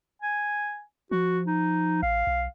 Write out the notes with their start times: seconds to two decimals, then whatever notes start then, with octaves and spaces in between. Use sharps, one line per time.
0.22 G#5
1.11 F3 F#4
1.47 D#4
2.03 A1 F5
2.27 B1